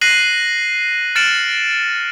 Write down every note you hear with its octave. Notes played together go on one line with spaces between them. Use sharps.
F#6 A#6 C7 D#7 F#7
F6 A6 C#7 D7 E7 F#7